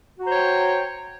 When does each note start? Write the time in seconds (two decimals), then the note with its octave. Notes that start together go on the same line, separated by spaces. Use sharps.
0.19 F#4
0.23 A#5
0.28 C5
0.32 C#5
0.36 G5